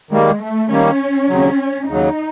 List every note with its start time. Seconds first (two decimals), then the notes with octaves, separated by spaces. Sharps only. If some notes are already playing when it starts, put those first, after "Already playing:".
0.11 D#3 G3 G#3 A#3
0.41 A3
0.70 D#3 G3 A#3 C#4
1.29 D#2 C#3 F#3
1.88 D#2 C#3 F#3 D#4